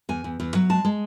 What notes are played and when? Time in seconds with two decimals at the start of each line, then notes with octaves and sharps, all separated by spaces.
0.09 E2 G#5
0.24 E2
0.40 E2
0.55 F#3
0.70 G#3 A5
0.85 G#3